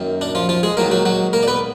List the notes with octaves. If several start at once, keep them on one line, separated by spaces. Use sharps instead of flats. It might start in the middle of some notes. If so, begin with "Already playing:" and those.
Already playing: F#2 D#3 A#3
D4
F3 F4
F3 F4
G#3 G#4
G#2 D#3 F#3 A#3 A#4
F#3 F#4
F#3 F#4
A#3 A#4
D5
B3 B4